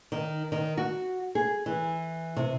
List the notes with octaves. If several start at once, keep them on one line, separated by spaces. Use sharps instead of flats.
D#3
D#3
F#4
G#4
E3
C3